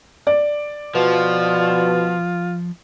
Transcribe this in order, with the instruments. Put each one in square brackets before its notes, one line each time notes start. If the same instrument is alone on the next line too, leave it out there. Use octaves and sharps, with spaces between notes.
[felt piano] D5
[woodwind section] B2 [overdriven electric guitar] F3 [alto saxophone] F4